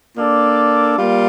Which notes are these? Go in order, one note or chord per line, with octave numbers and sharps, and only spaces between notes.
A#3 D4 A4 D5
G3 A#3 F4